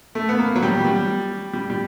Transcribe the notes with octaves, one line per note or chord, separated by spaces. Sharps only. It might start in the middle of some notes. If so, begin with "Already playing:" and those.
A3
B3
A#3
F#3
G3
G3
G3
G3